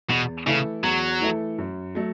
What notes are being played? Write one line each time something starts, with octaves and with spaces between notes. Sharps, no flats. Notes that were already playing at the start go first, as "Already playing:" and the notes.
E2 B2
C#3 E3 A3 E4 A4
E2 F#3
E3 A3 E4 A4
F#2
F#3 A3